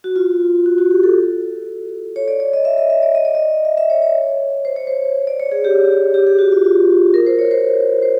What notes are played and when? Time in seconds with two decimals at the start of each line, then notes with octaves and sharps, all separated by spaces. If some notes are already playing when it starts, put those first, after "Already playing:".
0.04 F#4
0.16 F4
0.66 F#4
0.78 F#4
0.91 G4
1.03 A4
2.16 C#5
2.28 D5
2.40 D5
2.53 D#5
2.65 E5
2.78 D#5
2.90 E5
3.02 D5
3.15 D#5
3.25 D5
3.35 D#5
3.65 E5
3.77 E5
3.90 C#5
4.02 C#5
4.65 C5
4.76 C#5
4.87 C5
5.27 D5
5.40 C#5
5.52 G#4
5.64 G4
6.14 G4
6.27 G#4
6.39 F#4
6.52 F4
6.64 F4
7.14 A#4
7.26 C5
7.39 C#5
7.51 C5
8.02 C5